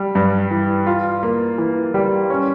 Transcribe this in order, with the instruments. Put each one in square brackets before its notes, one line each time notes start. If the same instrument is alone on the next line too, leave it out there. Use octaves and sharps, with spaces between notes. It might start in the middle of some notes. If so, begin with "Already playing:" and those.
Already playing: [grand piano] G3
G2
E3
F4
A#3
E3
G3
C#4